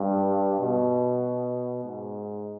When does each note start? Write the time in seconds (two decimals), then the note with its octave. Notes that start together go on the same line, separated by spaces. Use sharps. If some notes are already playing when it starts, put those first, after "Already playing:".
Already playing: G2
0.59 B2
1.84 G#2